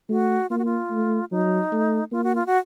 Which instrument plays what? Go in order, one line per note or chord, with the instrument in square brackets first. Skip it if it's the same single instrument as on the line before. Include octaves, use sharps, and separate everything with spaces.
[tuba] A3 [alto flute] F#4
[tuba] A#3 [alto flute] F4
[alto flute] F#4
F4
[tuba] A3
[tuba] F#3 [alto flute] D#4
[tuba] A3
[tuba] A#3 [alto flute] F4
[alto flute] F#4
F4
F#4